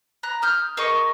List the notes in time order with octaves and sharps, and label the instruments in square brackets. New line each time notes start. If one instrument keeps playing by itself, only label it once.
[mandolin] A#5 F#6
D#6 F6 G6
G#4 A#4 D#5 C#6